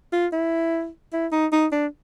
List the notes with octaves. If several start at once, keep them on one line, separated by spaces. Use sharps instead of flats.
F4
E4
E4
D#4
D#4
D4